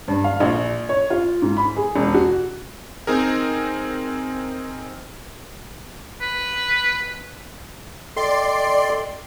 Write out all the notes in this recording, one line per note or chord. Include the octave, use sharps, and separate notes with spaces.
G2
F5
A#1
C#5
F4
G#2
B5
G#4
E1
F#4
C4 D#4 G#4 A#4
B4
A4 D5 D#5 G5 C6